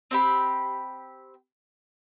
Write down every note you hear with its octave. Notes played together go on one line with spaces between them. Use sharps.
C4 G4 B5